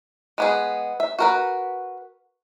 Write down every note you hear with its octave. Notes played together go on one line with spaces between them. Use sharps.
G#3 B3 G#4
E5
F#4 A#4 B4